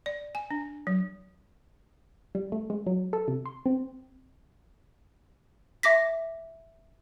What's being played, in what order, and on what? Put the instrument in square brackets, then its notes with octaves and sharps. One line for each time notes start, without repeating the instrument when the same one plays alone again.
[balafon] D5
G#5
D4
F#3
[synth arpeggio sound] G3
A3
G#3
F#3
A4
C3
C6
C4
[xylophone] E5 D6 A#6 B6